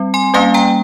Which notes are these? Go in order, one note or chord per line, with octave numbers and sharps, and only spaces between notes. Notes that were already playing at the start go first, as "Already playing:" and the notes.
Already playing: G3 C4
G#5 C6
G3 A#3 C#4 F5 G#5
G5 A#5